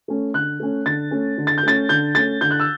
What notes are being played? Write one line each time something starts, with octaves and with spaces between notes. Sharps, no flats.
A3 C#4
D3 F#6
A3 C#4
D3 A6
A3 C#4
D3
A6
G6
A3 C#4 A6
D3 G6
A3 C#4 A6
D3 G6
F#6
E6